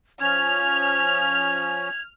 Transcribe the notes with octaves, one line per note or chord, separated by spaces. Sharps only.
F3 C#4 F6 G#6